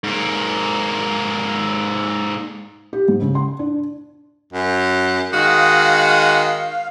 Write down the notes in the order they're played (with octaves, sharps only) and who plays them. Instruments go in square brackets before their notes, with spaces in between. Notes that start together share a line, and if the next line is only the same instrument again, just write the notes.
[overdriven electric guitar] G#2 A#3
[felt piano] G4
G#2
C#3
C6
D4
[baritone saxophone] F#2
[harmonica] D#3 G#3 D#6 [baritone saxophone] F#4 [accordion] F5